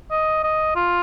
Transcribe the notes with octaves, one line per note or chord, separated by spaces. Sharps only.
D#5
D#5
F4